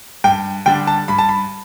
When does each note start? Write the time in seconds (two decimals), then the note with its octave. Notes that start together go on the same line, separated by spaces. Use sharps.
0.24 G2 G5
0.66 D3 G3 D4 G5
0.87 A5
1.08 G2 B5
1.19 A5
1.29 B5